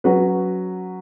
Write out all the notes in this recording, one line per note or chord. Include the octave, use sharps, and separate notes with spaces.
F#3 C#4 F#4 B4